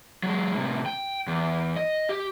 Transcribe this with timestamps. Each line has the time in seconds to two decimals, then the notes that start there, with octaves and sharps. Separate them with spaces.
0.23 F#3 G#3
0.55 A2 C3
0.86 G5
1.27 E2
1.76 D#5
2.09 G4